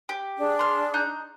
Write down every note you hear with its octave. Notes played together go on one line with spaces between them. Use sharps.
G4
D4 G#4
C6 F6
D#4 A#5 F#6